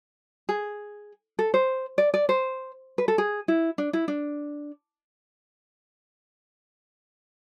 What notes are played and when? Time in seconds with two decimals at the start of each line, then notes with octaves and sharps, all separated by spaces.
0.49 G#4
1.39 A4
1.54 C5
1.98 D5
2.14 D5
2.29 C5
2.98 B4
3.08 A4
3.18 G#4
3.48 E4
3.78 D4
3.93 E4
4.08 D4